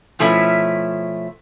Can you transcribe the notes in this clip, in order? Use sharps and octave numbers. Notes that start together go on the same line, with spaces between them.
B2 F3 A3 C#4 E4